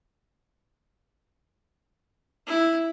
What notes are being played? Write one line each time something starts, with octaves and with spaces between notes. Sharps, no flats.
E4